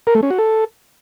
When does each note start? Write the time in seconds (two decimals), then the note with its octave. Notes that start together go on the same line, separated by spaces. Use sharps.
0.07 A#4
0.15 A3
0.23 C#4
0.31 F#4
0.38 A4